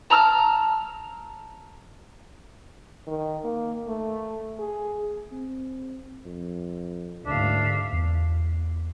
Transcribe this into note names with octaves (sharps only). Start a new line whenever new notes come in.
A5 A#5 E6 F6
D#3
A#3
A3
G#4
C4
F2
F#1 D2 G#2 D4 E5 F5
E2